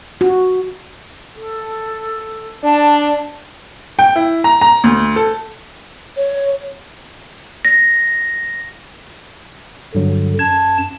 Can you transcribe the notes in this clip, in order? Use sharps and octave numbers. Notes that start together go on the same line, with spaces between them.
F#4
A4
D4 A5
G5
E4
A#5
A#5
D2
A4
C#5
A#6
G2 D3 F#3
F#2 A5 G#6